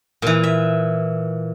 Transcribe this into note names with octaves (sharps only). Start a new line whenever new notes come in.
A#2 E3
E5